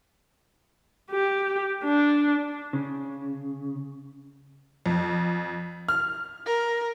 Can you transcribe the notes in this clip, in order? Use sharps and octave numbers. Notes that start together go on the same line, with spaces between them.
G4
D4
C#3
F2
F6
A#4